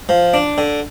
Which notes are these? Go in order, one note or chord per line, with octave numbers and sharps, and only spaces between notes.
F3
D4
D3